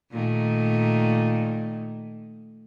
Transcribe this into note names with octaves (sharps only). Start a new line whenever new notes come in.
A#2 D#3 A3